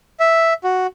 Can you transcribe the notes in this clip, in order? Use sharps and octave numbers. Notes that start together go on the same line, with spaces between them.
E5
F#4